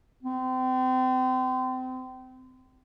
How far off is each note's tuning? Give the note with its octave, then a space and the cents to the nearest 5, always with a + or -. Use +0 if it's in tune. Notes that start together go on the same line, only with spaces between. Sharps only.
C4 -30